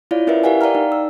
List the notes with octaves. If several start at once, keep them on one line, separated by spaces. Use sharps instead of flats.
E4 F4 C#5 D5 F5
C#4 E4 A#4 B4 E5
G4 A#4 F5 F#5 G#5
D5 F5 G5 A#5 F6
D#4
E6